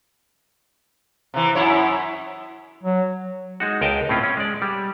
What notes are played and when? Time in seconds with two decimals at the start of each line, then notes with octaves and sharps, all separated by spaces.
1.34 C3 E3
1.55 F#2 E4 C#5
2.83 F#3
3.60 G#3 D#4 F#4
3.81 C#2 A#4 D#5 G5 A5
4.09 A2 C4 C#4 F4
4.23 C#4
4.37 G#3 D5
4.62 G3